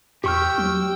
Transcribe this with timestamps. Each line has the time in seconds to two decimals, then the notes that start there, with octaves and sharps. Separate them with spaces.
0.24 E2 G4 G5 C#6 E6 F6
0.58 F#3